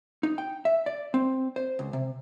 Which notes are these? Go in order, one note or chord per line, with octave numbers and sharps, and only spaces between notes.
D#4
G5
E5
D5
C4
C5
C#2
C3